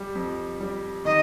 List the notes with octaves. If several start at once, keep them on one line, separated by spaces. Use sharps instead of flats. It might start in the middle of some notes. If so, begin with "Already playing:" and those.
Already playing: G3
F2
G3
D#3 D#5